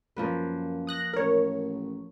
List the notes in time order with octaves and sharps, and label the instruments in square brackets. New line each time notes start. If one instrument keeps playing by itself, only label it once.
[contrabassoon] F#2 [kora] F3 A#3 B4
[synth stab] D#6 F#6 A#6
[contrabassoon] A1 [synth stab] A#4 C#5